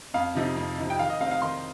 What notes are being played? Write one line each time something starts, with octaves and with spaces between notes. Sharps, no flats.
F2 F5
C3 F3 D#4
F2
C3 F3 D#4
G5
D#3 F5
D#5
C4 D#4 F5
F5
D#3 C6